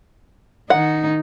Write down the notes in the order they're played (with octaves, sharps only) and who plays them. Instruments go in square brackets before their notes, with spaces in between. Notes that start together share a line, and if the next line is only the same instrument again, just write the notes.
[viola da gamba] D#3 D#4 [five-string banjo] F#5